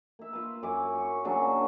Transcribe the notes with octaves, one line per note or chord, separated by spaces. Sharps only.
A#3 E5
F4 B4
F#2 E4 G#5 D6
C#6
A#2 C#3 F#3 D4